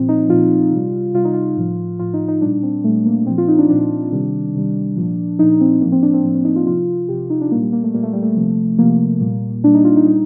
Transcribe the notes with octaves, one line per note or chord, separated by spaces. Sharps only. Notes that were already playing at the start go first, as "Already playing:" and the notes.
Already playing: A#2 F3 C4
D#4
A#2 F3 F4
C3 G3
C3 G3 F4
D#4
F4
A2 F3
A2 F3 F4
D#4
D#4
A#2 G3 D4
C4
A#2 G3 A3
A#3
A#2 F3 C4
F4
D#4
D4
A#2 F3 D4
C3 D#3 G3
C3 D#3 G3
A#2 F3
A#2 F3 D#4
C4
A2 F3 A#3
C4
D4
C4
A2 F3
C4
D#4
F4
C3 F3 F4
C3 F3 G4
D#4
D4
A#2 G3 A#3
G3
A#3
A3
A#2 G3 A#3
A3
G3
A3
C3 F3
C3 F3 A#3
A#2 G3
A#2 G3 D4
D#4
F4
D#4
A#2 G3 D#4